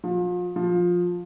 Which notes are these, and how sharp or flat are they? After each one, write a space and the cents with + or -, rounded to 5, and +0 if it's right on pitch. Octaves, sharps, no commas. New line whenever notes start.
F3 +35
F3 +15